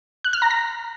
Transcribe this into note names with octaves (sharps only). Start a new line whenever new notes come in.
F#6
F6
A#5
A#6